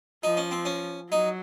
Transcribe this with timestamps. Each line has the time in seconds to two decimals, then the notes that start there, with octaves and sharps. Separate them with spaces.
0.23 F3 D#4
0.37 C#4
0.51 C4
0.65 C#4
1.12 F#3 D#4